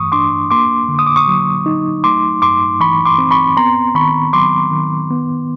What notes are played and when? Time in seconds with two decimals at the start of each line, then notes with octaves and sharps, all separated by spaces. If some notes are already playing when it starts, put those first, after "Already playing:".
Already playing: G2 E3 A3 C#6 D#6
0.12 D4 C6 D6
0.51 A#3 C6 D6
0.89 D3
0.99 D#6
1.07 D6
1.16 C#6 D#6
1.28 F#3
1.66 D#4
2.04 A3 C6 D6
2.42 G2 C6 D6
2.80 E3 B5 C#6
3.05 C6 D6
3.18 C4
3.31 B5 C#6
3.57 B3 A#5 C6
3.95 D#3 B5 C#6
4.33 F#3 C6 D6
4.71 D#3
5.11 B3